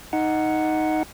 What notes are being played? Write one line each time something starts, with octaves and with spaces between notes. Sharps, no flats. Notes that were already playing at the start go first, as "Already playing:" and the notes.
D#4 F#5